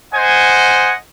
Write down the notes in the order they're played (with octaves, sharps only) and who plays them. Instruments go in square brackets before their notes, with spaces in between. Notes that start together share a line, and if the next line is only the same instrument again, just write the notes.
[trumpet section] C5 D#5 F#5 G#5